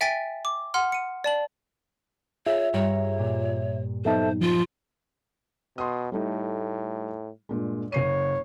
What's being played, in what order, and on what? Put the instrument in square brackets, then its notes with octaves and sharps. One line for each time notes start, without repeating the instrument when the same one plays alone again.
[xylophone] E5 G5 G#5 A6 B6 D7
D6
F#5 C6 F6
C#7 D#7
D5 A5 F#7
[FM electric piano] F4 G#4 [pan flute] C#5 [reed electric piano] E5
[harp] G2 A#5 C#7 [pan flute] C#5
[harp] A#2
[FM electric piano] F#3 B3 D#4 [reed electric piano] A4 E5 A5 [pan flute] C5
[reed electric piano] F3 [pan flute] F4
[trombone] B2 [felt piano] C6 D#6
[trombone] A2 [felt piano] G3 A3 D#4
[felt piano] G2 A#2 G#3
[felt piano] F#1 C7 D#7 [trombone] C#5